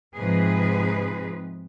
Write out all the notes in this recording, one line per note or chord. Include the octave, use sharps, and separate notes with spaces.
G#2 C3 F3 D#4 G#4 B4